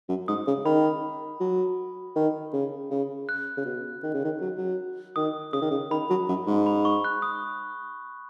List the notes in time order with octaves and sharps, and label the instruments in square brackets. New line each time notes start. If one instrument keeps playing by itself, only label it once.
[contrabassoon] F#2
[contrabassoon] G#2 [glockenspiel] D#6
[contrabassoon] C#3
[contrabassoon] D#3 [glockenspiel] B5
[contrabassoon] F#3
D#3
C#3
C#3
[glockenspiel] F#6
[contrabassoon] C#3
B2
D#3
C#3
D#3
F#3
F#3
[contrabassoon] D#3 [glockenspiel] D#6
[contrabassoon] C#3 [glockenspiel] D#6
[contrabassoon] D#3
C#3
[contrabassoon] D#3 [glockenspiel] B5
[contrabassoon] F#3
F#2
G#2
[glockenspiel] B5
C#6
F#6
D#6